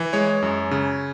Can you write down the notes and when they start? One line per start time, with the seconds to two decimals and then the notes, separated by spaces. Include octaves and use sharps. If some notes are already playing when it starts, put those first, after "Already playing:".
Already playing: E3
0.13 G#3 C#5
0.42 F#2
0.71 C#3